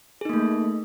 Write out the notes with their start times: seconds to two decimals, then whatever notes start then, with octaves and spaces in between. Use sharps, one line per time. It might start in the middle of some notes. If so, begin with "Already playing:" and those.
0.21 G#4
0.25 D#4
0.29 A#3
0.33 A3